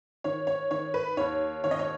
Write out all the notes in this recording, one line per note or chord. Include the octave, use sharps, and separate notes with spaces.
D#3 C#5
C#5
D#3 C#5
B4
D#2 C#5
D#3 C#5
D#5
C#5